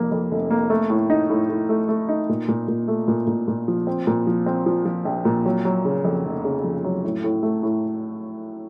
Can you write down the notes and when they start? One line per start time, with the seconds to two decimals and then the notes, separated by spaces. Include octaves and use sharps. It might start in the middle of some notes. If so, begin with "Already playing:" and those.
Already playing: F1 F2 A#3
0.12 F2
0.31 F1
0.50 A#3
0.70 A3
0.90 A2
1.10 D#4
1.30 A2
1.49 A2
1.69 A3
1.89 A3
2.09 D#4
2.29 A#2
2.48 A#2
2.68 A#2
2.88 A3
3.08 A#2
3.27 A#2
3.48 A#2
3.68 F3
3.87 C4
4.07 A#2
4.27 F3
4.46 C4
4.66 F3
4.85 F3
5.05 A#1
5.25 A#2
5.46 F#3
5.65 F#3
5.85 C#3
6.04 F2
6.25 F1
6.44 C#3
6.64 F2
6.84 F#3
7.04 A2
7.24 A2
7.43 A3
7.63 A2